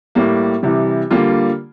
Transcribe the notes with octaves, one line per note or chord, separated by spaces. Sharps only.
A2 G3 A#3
C3 E3 G3
D3 G3 A#3 F4